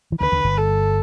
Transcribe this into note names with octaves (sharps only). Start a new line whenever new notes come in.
E3
D2 D3 B4
D2 D3
G1 G2
A4